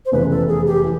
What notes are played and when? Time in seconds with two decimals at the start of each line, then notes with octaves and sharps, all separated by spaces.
0.05 C5
0.12 F1 E2 C#3 E3 B4
0.30 A4
0.48 G#4
0.66 G4
0.84 E3